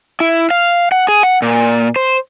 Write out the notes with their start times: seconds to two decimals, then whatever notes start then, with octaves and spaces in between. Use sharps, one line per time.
0.20 E4
0.50 F5
0.92 F#5
1.08 G#4
1.23 F#5
1.42 A#2
1.96 C5